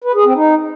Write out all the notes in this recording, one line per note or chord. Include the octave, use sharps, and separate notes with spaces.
B4
G#4
C4
D#4